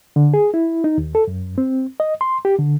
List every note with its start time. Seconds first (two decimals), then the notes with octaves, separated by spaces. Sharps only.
0.16 D3
0.34 G#4
0.54 E4
0.84 D#4
0.98 D#2
1.15 A4
1.28 F#2
1.58 C4
2.00 D#5
2.21 C6
2.45 G4
2.59 D3